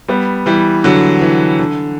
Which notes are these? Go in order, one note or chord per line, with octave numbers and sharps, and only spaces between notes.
G3 B3
E3 G3
D3 F#3
E3
D3